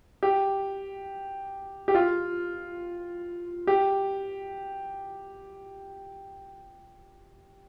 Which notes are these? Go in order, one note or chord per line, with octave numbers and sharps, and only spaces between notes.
G4
G4
F4
G4